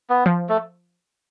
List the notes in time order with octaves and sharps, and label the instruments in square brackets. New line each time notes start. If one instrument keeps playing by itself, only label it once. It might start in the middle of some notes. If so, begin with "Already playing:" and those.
[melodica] B3
[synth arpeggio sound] F3
[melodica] A3